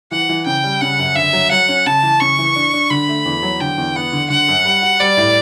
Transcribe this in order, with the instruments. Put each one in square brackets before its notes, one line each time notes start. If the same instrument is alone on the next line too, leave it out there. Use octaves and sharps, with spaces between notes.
[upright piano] E3 [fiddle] F#5
[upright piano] E3
[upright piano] C#3 [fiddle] G5
[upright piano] G3
[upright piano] C#3 [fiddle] F#5
[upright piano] F#2
[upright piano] D3 [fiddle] E5
[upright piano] F#3
[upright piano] F#3 [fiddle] F#5
[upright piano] C#4
[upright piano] C#3 [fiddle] A5
[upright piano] E3
[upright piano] C#3 [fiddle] C#6
[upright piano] E3
D4
D4
[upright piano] D3 [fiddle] B5
[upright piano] A3
E2
F#3
[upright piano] D3 [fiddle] G5
[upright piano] E2
[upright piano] B3 [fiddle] F#5
[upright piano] D3
[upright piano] D3 [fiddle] F#5
[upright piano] F#2
G3
F#4
[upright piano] G3 [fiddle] D5
[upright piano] A2